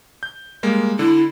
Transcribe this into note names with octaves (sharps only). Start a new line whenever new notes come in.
G6
G3 G#3 A#3
D3 E4